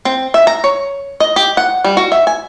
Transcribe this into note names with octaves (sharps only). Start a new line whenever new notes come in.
C4
E5
A#5
C#5
D#5
G4
F#5
G3
F#4
E5
G#5